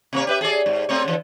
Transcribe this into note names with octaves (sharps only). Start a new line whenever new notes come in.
C3 A#3 C#5
G4 B4 E5
G#4 A4 D5
G#2
A3 C4 C#5
D3 E3